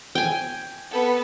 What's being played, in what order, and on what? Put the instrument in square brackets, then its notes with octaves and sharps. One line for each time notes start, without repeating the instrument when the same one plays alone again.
[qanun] G5 G#5
[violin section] B3 A4 B4